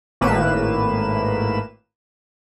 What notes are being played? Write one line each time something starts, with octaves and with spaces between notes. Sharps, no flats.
G#1 A2 A#3 B4 E7